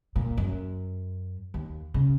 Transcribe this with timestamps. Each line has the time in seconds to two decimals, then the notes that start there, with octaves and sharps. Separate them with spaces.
0.16 A#2
0.38 F#2
1.54 D#2
1.94 C#3